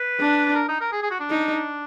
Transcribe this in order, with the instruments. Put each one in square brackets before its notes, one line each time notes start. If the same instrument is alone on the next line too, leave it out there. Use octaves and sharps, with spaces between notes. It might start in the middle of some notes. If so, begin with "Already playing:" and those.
Already playing: [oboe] B4
[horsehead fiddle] D4
[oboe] A#4
D#4
A#4
G#4
G#4
F#4
D4
[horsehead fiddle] D#4